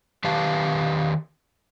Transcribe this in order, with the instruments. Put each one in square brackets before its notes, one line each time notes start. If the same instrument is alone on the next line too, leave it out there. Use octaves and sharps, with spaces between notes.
[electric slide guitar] D#3 G4 B4 F5 A5